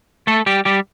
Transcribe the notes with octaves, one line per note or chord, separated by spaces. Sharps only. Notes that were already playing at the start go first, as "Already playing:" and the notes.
A3 A4
G3 G4
G3 G4